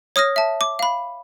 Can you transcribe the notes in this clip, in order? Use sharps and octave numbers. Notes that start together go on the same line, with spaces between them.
C#5 D#6 F6 A#6
E5 A5
D6
F5 B5